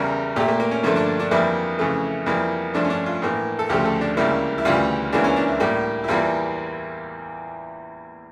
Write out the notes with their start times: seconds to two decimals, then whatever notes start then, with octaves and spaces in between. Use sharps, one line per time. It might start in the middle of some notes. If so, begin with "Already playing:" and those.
Already playing: E2 C#3 G3 A#4
0.36 A#2 A3 G4
0.48 A#3
0.60 A#3
0.71 C#4
0.83 G2 D3 F3 A3 A#3
0.96 D4
1.20 D4
1.31 F2 E3 G3 A#3 E4
1.79 F2 C#3 E3 A3
2.26 F2 E3 G3 A#3
2.74 G2 F3 A3 D4
2.85 C#4
2.90 D4
3.06 F4
3.22 A2 E3 A#3
3.59 A4
3.69 D2 C#3 F3 A3 G4
3.85 A4
4.01 D4
4.17 C#2 C#3 G3 A#3 E4
4.58 E4
4.65 D2 C#3 E3 G3 F4
5.12 C#2 C#3 E3 A#3 D4
5.24 C#4
5.36 D4
5.48 E4
5.60 A2 G3 A#3
6.04 E4
6.08 E2 E3 G3 A#3 F4